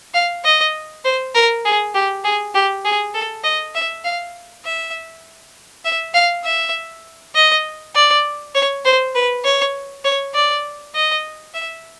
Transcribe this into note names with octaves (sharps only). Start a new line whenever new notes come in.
F5
D#5
C5
A#4
G#4
G4
G#4
G4
G#4
A4
D#5
E5
F5
E5
E5
F5
E5
D#5
D5
C#5
C5
B4
C#5
C#5
D5
D#5
E5